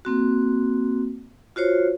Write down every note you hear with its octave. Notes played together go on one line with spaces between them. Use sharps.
A#3 C4 F#4
F4 F#4 C5 C#5